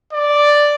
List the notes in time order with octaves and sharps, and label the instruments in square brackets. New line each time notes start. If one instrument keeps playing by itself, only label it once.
[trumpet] D5